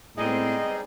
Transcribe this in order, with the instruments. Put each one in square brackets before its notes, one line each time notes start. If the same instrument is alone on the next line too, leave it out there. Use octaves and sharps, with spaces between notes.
[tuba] A2 [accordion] G3 D#4 G#4 [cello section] G#3 B3 C4 [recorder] D#5